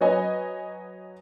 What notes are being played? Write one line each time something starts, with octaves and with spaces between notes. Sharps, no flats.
F#3 B4 C#5 D#5 G#5